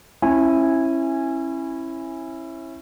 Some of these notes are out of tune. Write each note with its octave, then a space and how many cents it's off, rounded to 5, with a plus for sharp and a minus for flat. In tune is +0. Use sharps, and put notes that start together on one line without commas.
C#4 -35 E4 +0 G#5 -10